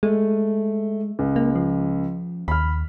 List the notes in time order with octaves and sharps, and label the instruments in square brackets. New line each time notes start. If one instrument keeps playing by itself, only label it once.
[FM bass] G#3 [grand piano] A3
[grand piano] C#2
[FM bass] A#3
F3
[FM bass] D#2 [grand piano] B5 F6